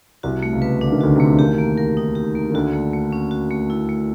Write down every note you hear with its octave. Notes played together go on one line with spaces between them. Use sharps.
C2 C3 F#4
A3
C#2 C#3
B4
D3 D4
D#3
D2 D3 F#4
C3
C#3 A3
D3
D#2 D#3 G4
A#3
A#4
D#4
G4
A#3
D#3
D2 D3 F#4
A3
A3
C#4
F#4
A3
E4
A3